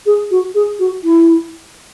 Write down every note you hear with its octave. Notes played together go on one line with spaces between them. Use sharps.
G#4
F#4
G#4
F#4
E4